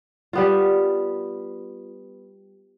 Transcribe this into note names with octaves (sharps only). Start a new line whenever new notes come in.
G3 B3 F4